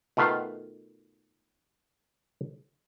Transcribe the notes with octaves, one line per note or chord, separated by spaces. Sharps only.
B2 D#3 A3 F4 B4 F5